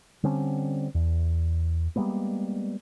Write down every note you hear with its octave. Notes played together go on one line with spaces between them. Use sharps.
D3 G3 C4 C#4
E2
G3 G#3 A#3 B3